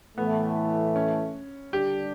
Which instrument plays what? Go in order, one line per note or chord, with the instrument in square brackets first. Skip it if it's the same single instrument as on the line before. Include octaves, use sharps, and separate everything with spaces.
[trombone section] A2 E3 A3 [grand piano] B3
[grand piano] C#4
[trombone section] D3 G3 D4 [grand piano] G4